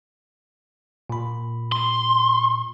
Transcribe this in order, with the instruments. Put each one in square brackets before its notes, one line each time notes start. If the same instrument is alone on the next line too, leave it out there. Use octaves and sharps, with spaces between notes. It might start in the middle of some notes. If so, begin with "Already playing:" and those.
[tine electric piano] A#2 B5
[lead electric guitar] C6